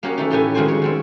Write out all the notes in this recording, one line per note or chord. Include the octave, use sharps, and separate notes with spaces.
A#3 C#4 F#4 G4 C#5 D#5
E3 A3 D#4
A2 A3 C#4 G4 B4 G#5
F2 D#3 G#3 F#4 C5 G#5
C#5
D#3 G3 C4